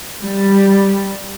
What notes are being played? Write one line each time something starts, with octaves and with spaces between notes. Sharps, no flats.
G3